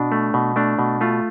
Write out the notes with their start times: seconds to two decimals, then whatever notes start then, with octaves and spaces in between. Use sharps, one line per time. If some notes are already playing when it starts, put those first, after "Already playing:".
Already playing: B2 D4
0.12 A3
0.34 B2
0.56 A3 D4
0.79 B2
1.01 A3 F4